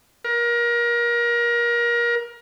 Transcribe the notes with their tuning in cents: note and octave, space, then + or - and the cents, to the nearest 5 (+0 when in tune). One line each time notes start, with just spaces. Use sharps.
A#4 +30